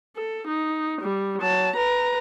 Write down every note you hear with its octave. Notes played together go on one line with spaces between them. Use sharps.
A4
D#4
G3
F#3 A5
B4 A#5